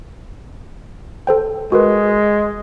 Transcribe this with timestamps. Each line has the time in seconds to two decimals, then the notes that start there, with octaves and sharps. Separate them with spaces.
1.27 A4 C5 G5
1.72 G#3 F#4 A#4 B4